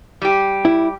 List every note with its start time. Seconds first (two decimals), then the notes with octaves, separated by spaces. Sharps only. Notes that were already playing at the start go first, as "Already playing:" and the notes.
0.22 G3 G4
0.65 E4